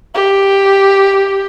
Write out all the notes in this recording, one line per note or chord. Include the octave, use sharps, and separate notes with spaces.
G4